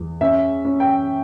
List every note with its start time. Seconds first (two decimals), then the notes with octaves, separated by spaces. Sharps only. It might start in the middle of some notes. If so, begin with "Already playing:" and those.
Already playing: E2
0.21 C#4 E5
0.65 C#4
0.80 G5